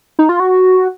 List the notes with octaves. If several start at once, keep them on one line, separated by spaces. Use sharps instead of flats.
D#4
F4
F#4